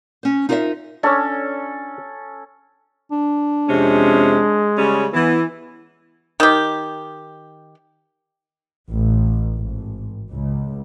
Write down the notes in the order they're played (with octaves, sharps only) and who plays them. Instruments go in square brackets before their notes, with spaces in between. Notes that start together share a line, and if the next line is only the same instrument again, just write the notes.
[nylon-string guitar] C#4 C5
D#4 F4 A#4 C5 C#5 E5
[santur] C#4 A4 [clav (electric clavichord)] D4 C#5
[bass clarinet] D4
[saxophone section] F2 C3 C#4 [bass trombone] G#3
[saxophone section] C#3 G3 C#4
[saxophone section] E3 [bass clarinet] B3
[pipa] D#3 G4
[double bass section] A1
G#1
C#2